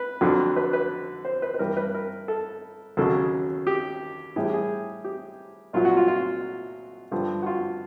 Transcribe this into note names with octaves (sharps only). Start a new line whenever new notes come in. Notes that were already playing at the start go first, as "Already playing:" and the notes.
Already playing: B4
F2 D3 F#3
B4
B4
C5
B4
B4
G2 E3 G3 A#4
B4
A#4
A4
D#2 C#3 F#3 A4
G4
A2 E3 G3 G#4
G4
G#4
G4
C2 A#2 F#3 F4
F#4
F4
F4
G2 D3 F3
F#4
F4